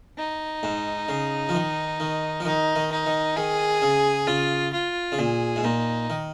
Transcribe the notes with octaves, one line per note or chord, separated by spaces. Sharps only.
D#4
G#2
C#3
F3
D#3
D#3
F3
D#3 D#4
D#3
D#4
D#3
D#3 G#4
C#3
C#3 F4
F4
C#3
A#2 G#4
G#2
A#2 D#4
D#3